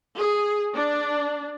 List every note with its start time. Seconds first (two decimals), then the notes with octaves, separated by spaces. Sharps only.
0.17 G#4
0.74 D4